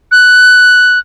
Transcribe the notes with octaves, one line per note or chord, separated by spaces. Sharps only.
F#6